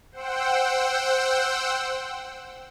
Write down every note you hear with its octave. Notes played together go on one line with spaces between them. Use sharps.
C5 F#5 G5 E6